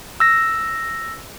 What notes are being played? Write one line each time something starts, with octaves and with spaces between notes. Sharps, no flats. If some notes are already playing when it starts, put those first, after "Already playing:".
E6 A#6